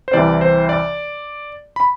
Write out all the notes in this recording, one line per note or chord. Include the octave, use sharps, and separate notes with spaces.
C5
C2 C3 E3 D5
C5
D5
B5